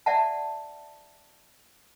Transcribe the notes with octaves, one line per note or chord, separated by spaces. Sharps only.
D5 E5 F#5 A5